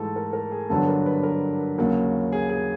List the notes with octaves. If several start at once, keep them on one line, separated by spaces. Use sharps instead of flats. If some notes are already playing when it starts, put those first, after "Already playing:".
Already playing: G#2 E3 A3 A4
A#4
A#4
G#4
G2 D3 F#3 B3 D4 A4
A#4
B4
A#4
D#2 C#3 F#3 A#3
G#4
G#4